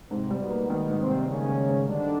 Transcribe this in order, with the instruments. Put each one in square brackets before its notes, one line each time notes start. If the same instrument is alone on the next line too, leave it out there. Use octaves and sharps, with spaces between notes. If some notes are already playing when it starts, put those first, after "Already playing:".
[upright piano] G#2 [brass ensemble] C3 C4
[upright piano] G3
[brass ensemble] B2 B3
[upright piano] A#3
[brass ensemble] B2 B3 [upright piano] D#3
[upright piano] G#2
[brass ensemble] C3 C4
[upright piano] G3
[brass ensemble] C#3 C#4 [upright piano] A#3
[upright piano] D#3
G#2
[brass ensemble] D3 D4 [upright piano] G3